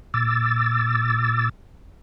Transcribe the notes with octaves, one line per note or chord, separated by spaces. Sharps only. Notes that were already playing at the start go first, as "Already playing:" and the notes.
A#2 D6 E6 A6